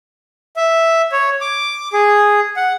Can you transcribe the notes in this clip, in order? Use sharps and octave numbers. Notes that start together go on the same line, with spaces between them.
E5
C#5
D6
G#4
F#5